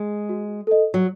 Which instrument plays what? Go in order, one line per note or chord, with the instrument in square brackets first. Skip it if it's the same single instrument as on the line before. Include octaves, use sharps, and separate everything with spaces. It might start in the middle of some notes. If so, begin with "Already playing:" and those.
Already playing: [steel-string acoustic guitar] G#3
[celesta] F#4
A4 D#5
[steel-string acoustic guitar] F#3